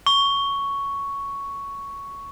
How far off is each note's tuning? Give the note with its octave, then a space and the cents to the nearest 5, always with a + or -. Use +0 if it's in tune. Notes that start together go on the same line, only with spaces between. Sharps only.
C#6 +5